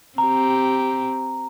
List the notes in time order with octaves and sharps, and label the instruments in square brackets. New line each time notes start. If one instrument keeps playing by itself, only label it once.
[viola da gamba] C4 G4 [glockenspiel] A#5